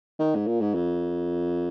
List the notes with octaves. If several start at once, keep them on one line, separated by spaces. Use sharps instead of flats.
D#3
G#2
A#2
G#2
F2